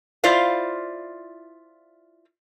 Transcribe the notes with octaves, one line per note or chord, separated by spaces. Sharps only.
E4 F4 C5 D5 F5